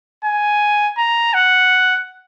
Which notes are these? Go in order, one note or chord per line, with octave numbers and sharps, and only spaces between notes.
G#5
A#5
F#5